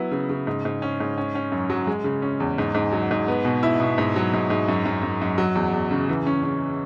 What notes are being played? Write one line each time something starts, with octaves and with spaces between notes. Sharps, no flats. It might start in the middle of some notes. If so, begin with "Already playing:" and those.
Already playing: F#3 B3 E4
C#3
C#3
G#2
G#2
C#4
G#2
C#4
C#4
F#2
F#3
G#3
C#3
C#4
E2
G#2
G#2
F#3
G#2
B3
B2
E4
B2
G#2
F#3
G#2
G#2
F#2
F#2
F#2
F#2
F#3
E2
E2
C#3
E3
C#4
C#4